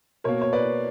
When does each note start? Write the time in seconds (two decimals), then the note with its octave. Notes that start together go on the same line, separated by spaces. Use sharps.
0.24 B2 A#3 A#4 C#5
0.42 C#5
0.53 B4 D5